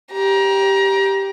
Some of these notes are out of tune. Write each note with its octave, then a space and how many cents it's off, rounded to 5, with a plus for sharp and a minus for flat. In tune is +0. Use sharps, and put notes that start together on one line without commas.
G4 +0 A#5 +25